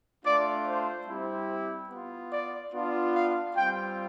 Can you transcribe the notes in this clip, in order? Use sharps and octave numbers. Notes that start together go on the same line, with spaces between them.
A3 D4 F4 D5
C5
G3 C4 E4 G4
B3 F4
D5
B3 D4 F4
F5
G3 C4 F4 G5